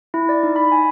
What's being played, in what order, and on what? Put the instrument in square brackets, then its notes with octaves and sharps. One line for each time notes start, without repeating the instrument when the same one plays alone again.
[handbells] E4
D5
D#4
B5
G#5